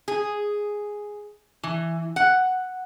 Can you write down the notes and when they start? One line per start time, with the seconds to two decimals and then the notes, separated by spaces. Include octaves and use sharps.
0.08 G#4
1.63 E3
2.16 F#5